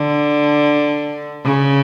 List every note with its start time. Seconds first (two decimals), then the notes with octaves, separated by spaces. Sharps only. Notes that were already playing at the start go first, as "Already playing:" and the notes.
Already playing: D3
1.45 C#3